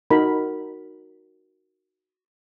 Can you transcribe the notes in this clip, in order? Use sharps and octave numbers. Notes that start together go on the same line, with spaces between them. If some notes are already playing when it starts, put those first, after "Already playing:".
D#4 F#4 A#4 B5